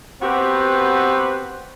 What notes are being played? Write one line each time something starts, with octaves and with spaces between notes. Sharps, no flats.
B3 C4 F#4 G4 B4